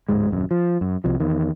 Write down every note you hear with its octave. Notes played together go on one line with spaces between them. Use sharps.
D1 G#2 G#3
D#1 F#2
F3
F#2
C2 C3 F3
E2 D#3